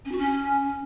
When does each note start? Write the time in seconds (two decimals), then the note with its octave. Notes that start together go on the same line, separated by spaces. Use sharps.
0.05 C#4
0.11 F#4
0.18 C#4